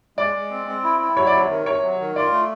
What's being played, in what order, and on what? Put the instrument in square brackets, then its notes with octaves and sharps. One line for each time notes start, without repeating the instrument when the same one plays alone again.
[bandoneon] G#3 [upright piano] D5
[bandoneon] G#3
C4
C4
E4
E4
[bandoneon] F#3 [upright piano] C#5
[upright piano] D5
[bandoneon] C3 [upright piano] C#5
[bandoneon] D#3
[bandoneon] C3 [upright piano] C#5
[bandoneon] F#3
D#3
[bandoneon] F4 [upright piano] D5
[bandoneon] A3